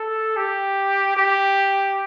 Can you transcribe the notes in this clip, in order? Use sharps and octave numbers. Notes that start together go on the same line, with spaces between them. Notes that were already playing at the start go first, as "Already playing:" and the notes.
Already playing: A4
G4
G4